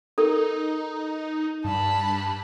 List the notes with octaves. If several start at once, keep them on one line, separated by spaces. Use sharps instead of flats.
D#4 A4 A#4
G2 A5 B5